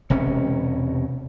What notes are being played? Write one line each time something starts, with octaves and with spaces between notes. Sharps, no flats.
E1 C3 C#4